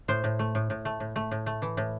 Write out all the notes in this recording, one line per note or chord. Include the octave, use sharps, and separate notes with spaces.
A2 C5
A2
A3
A2
A2
A3
A2
A3
A2
A3
E3
A2